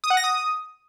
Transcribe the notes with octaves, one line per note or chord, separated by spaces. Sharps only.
D#6
F#5
A#6
D#6